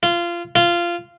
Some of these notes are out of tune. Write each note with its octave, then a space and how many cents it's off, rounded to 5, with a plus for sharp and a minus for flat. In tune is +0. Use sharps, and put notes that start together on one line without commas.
F4 -20
F4 -15